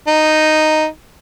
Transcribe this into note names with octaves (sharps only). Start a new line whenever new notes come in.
D#4